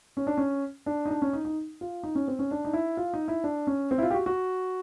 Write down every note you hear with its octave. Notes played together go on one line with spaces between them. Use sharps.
C#4
D4
C#4
D4
D#4
D4
C#4
D#4
D#4
F4
D#4
C#4
C4
C#4
D4
D#4
E4
F4
D#4
E4
D4
C#4
C4
E4
F4
G4
F#4
F#4